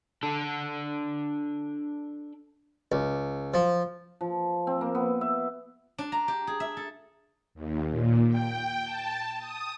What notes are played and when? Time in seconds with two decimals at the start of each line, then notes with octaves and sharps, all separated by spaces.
0.23 D4 A4
2.92 C#2
3.54 F3
4.21 F3
4.67 C4
4.81 A#3
4.95 B3
5.21 E5
5.98 D4
6.12 A#5
6.28 G4
6.47 G#4
6.60 E5
6.77 A4
7.55 D#2
7.90 A#2
8.29 G5
8.84 A5
9.38 D#6